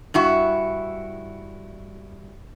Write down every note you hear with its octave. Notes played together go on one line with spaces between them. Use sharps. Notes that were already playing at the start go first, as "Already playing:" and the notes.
G2 E4 F#4